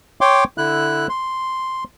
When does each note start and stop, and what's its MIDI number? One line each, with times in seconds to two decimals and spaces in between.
0.21 0.44 73
0.21 0.44 79
0.21 0.44 84
0.21 0.44 86
0.58 1.07 50
0.58 1.07 64
0.58 1.07 90
1.09 1.84 84